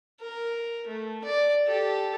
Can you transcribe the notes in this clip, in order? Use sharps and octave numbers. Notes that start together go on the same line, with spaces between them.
A#4
A3
D5
G4 A4